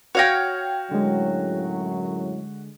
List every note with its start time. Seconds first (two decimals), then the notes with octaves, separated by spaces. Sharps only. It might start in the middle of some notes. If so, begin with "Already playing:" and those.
0.15 F#4 C#5 F5 G5 A#6
0.91 F#2 A2 D3 F#3 G#3